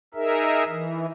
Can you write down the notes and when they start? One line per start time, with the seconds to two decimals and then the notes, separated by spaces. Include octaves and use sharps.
0.14 D#4 G#4 A#4 E5
0.67 E3